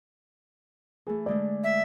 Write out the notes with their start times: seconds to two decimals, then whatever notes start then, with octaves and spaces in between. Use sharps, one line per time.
1.07 E3 A3 G#4
1.26 D3 G#3 A3 D5
1.64 E5